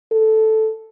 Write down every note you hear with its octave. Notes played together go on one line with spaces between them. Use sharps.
A4